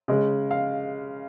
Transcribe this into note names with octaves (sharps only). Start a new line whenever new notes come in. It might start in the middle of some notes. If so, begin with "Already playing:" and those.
C#3 G#3
F5